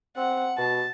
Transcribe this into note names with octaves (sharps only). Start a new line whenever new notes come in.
C4 F#5
B2 A5